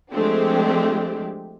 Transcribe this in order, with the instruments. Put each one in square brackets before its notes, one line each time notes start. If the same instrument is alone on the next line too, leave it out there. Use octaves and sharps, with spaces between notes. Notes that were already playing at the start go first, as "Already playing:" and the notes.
[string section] F3 G#3 A3 C4 D4 G4